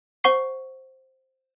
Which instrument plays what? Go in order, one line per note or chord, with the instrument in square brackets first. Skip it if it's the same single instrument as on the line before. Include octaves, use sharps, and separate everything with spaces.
[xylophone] C5 F#5 C#6 C7